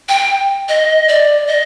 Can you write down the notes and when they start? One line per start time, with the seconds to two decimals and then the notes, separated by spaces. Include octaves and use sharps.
0.09 G5
0.69 D#5
1.08 D5
1.47 D#5